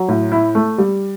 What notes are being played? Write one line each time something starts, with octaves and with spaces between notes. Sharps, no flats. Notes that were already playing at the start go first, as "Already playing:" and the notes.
Already playing: F#3
A2
E4
A3
G3